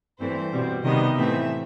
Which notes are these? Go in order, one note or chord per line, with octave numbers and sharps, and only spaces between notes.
G2 E3 A3 C4 C5
B2 G3 C4
C3 D#3 G3 B3 D#5
A2 E3 A3 C4 E5